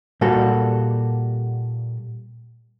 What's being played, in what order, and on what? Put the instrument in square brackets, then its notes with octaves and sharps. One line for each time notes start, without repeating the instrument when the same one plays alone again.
[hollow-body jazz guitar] A#2 G3 A#3 F#4 A4